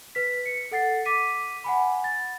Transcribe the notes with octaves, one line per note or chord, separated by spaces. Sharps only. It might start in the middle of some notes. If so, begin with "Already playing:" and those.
B4 B6
C#7
A4 F#5 A6 C7
D6 B6 D#7
F#5 G#5 B5
A6